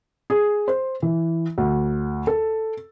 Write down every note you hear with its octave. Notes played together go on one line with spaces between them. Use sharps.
G#4
C5
E3
D2
A4